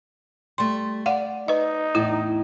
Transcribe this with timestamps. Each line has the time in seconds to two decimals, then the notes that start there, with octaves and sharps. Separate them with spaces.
0.58 G3 A3 C6
1.06 D5 F5 F#5
1.48 D#4 B4 D#5
1.95 E2 A2 E4